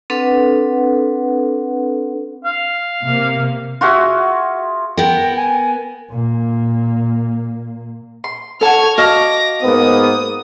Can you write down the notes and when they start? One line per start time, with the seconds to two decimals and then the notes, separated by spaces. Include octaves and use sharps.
0.10 C4 D4 A4 B4 F#5
2.45 F5
3.04 C3 A#3
3.81 F4 F#4 G#4 E5
4.97 B3 A#4 G5
5.37 G#5
6.10 A#2 A#3
8.24 C6
8.61 F#4 A4 C#5 A5 F6 G#6
8.98 F#4 D#5 F5 A5 D6 A#6
9.63 G#2 A#3 B3 D#6